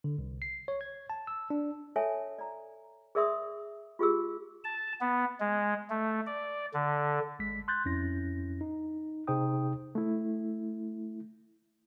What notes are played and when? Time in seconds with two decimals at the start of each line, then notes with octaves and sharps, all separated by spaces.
0.04 D3
0.18 C2
0.42 C7
0.68 C#5
0.81 G#6
1.10 A5
1.27 E6
1.50 D4
1.96 A4 C#5 E5 G#5 A5
2.39 D5 A#5
3.15 G#4 A#4 D5 E5 C6 D#6
3.99 F4 G4 G#4 E6
4.64 A5
5.01 B3
5.40 G#3
5.90 A3
6.26 D5
6.74 D3
7.39 G#1 G#3 B6
7.68 C6 F#6 G6 A6
7.85 F2 C#4 E4 A#6
8.61 D#4
9.27 C3 D#4 G#4 C5 G5 D#6
9.95 A3 E4